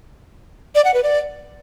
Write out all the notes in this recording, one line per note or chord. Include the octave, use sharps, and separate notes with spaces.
D5
F#5
B4
D5